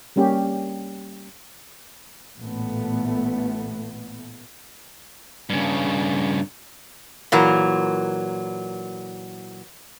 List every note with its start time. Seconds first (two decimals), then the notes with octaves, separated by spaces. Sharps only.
0.16 G3 A#3 C#4 G4
2.39 A1 A#2 A3 B3
5.50 G2 C#3
7.32 A#2 E3 F#3 A#4